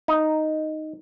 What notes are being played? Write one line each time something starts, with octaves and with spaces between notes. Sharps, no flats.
D#4